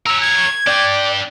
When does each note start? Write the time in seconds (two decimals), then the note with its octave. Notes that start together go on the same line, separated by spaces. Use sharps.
0.06 A#4 C#5 E6
0.21 G#6
0.67 D4 D5 G5